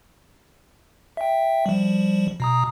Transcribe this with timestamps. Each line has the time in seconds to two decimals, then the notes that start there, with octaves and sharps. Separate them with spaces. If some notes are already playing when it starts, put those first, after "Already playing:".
1.17 E5 G5
1.66 F3 G3
2.40 B2 A#5 D#6